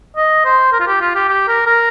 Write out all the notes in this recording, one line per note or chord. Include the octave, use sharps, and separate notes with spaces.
D#5
C5
A#4
F4
G4
F4
G4
G4
A#4
A#4